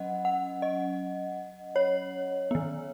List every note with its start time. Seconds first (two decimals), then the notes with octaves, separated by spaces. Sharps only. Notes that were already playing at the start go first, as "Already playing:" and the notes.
Already playing: F#3 C#4 D#5 F#5
0.25 F#5
0.62 D#5
1.76 C#5
2.51 D#3 B3